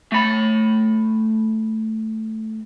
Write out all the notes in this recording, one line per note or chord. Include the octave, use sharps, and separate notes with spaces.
A3 B5